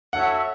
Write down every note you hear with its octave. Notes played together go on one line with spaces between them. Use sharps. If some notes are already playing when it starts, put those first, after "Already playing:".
F#4 A4 C#5 E5 F#5